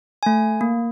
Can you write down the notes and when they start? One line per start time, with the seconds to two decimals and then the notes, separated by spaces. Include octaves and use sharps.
0.23 A3 G#5
0.61 A#3